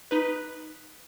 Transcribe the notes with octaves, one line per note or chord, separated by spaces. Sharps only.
D#4 B4